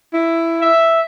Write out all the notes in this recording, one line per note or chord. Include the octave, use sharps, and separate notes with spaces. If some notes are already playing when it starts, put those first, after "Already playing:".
E4
E5